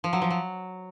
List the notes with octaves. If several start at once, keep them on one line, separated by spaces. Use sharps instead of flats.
F3
F#3
F3
F#3